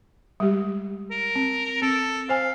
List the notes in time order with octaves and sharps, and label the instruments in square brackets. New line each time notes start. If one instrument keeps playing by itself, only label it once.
[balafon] G3 G#3 G4
[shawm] A#4
[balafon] C4
[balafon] C4 [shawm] A4
[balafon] C5 G#5 [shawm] F5